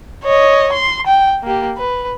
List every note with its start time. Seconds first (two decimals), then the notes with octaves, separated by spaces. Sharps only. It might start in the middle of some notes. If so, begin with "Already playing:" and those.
0.24 C#5 D#5
0.72 C6
1.07 G5
1.44 A#3 G4
1.77 B4